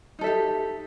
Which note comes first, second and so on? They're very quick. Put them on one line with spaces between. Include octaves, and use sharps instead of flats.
D#4 A4 E5 G4